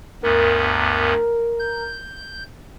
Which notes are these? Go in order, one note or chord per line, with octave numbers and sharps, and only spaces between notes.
D2 G2 B3 A#4
G6